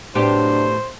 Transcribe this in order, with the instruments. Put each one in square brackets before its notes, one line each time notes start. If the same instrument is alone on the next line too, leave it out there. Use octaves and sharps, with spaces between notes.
[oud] A2 B3 G4 [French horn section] C3 F#3 D4 [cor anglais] C5